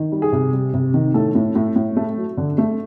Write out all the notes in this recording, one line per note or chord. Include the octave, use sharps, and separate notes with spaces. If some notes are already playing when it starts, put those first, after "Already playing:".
Already playing: D#3
G3
G#4
C3
G3
C3
D#3
A2 A4
A2
A2
A2
A3
F#3
D3
A3